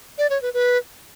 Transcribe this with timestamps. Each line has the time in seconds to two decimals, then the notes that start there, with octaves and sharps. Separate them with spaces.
0.18 D5
0.30 C#5
0.42 B4
0.54 B4